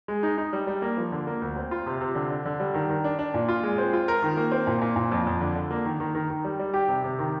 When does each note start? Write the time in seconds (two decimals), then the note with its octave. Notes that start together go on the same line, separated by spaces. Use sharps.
0.08 G#3
0.23 D#4
0.38 D#4
0.53 G3
0.67 G3
0.82 A#3
0.97 F3
1.12 D3
1.27 A#3
1.42 D2
1.56 C4
1.71 F4
1.86 C3
2.01 C3
2.15 D3
2.30 D4
2.45 D3
2.60 G3
2.74 D#3
2.89 D#3
3.04 D4
3.19 D4
3.34 A#2
3.49 F4
3.63 G#3
3.78 C4
3.93 F4
4.08 A#4
4.22 D#3
4.37 A#3
4.52 C4
4.67 A#2
4.82 A#2
4.96 A#2
5.12 F2
5.27 F2
5.41 D3
5.56 D3
5.71 A#3
5.85 D#3
6.00 D#3
6.15 D#3
6.30 D#3
6.44 G3
6.59 G3
6.74 G4
6.88 C3
7.04 C3
7.19 D#3